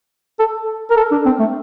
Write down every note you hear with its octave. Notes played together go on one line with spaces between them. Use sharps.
A4
A#4
A4
D4
C4
A3